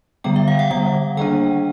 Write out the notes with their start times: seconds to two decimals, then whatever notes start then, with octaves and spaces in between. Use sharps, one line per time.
0.24 D3 G3 B3 G5
0.36 E5
0.48 F5
0.59 F#5
0.71 D3 G3 B3 F#5
1.17 D#3 G3 A#3 D4 G5